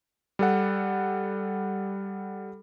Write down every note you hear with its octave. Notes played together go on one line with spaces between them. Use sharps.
G3 A4 F#5